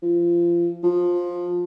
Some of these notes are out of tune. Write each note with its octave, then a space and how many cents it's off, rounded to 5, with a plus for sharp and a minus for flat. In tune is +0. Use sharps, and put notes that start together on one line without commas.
F3 -25
F3 +15